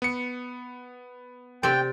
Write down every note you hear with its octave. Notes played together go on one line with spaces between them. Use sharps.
B3 C#7
C3 C4 D5 G5